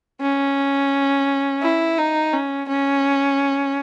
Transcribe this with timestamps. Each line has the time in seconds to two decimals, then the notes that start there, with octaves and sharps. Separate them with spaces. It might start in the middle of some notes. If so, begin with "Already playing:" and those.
0.21 C#4
1.62 E4
1.98 D#4
2.33 C#4
2.68 C#4